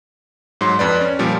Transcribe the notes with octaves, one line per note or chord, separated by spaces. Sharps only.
G#2 F#3 C6
F2 B4 D5
C#4
A#2 F3 G3